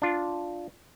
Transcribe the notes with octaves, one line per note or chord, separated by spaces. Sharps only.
D4 F4